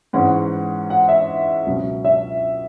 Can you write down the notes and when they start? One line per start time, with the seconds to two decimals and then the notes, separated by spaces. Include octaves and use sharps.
0.13 G#2 E3 G#3 C#4 F#5
0.90 F#5
1.08 E5
1.66 C#2 B2 F#3 C#4
2.05 E5